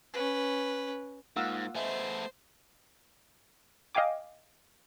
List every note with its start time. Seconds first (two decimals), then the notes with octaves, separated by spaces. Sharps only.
0.13 C#4 B4
1.36 G#2 A#3 F4 F5 F#5 E6
1.75 A3 B3 C5 D#5 E5 G#5
3.95 D#5 F5 G5 G#5 D6